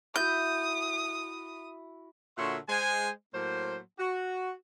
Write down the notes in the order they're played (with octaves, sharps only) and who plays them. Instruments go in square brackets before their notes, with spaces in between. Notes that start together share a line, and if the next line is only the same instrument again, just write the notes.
[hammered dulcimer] E4 F#4 [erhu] D#6 [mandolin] G6
[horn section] A#2 D3 F#4 C#5 E5 C6
G#3 C5 G#5
A2 F#3 A#3 C5
F#4